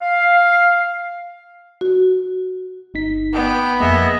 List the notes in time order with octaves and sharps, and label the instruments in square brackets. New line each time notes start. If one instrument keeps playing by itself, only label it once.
[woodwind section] F5
[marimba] F#4
[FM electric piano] G1 D#4 B6
[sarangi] B3 [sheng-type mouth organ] G5 D6
[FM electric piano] F2 A#3 [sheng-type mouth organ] G#4 D#5 E5